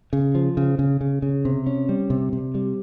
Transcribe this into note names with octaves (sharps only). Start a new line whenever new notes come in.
C#3
F3
C#3
C#3
C#3
C#3
C3
C#4
G3
C3
C3
G3